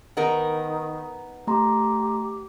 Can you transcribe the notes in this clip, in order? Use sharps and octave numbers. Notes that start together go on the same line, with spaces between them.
D#3 B3 D#4 A#4
A3 G4 A#5 C6